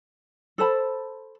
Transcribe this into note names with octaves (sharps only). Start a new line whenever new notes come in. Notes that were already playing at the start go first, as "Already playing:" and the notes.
A4 C5 A5 B5